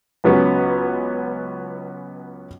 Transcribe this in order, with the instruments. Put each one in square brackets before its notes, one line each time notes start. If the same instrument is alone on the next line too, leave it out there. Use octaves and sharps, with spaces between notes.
[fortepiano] C#2 F#3 B3 C#4